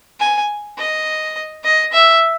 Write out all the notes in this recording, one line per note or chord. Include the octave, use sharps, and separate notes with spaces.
G#5
D#5
D#5
E5